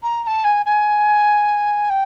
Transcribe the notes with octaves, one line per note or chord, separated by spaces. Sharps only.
A#5
A#5
A5
G#5
G#5
G5